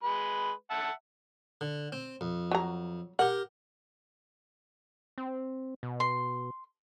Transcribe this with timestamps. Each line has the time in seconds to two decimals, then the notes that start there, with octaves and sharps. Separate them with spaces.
0.03 G#3 B4
0.71 E5 F#5 A5
1.61 D3
1.92 C4
2.21 F2
2.51 F#3 A#5
3.19 G4 A#4 F#5
5.18 C4
5.83 B2
6.00 C6